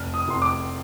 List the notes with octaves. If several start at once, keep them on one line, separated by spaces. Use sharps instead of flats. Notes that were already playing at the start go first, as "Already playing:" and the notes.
Already playing: F1 F6
D#6
F1 C6
D6